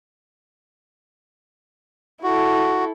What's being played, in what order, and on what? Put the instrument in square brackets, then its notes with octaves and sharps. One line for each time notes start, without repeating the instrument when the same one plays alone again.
[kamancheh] E4 A4 [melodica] F#4